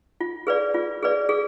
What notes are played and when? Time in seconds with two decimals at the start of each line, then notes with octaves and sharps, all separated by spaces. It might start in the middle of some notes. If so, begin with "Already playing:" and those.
0.21 F4
0.47 G#4 B4 D5
0.74 F4
1.03 G#4 B4 D5
1.29 G#4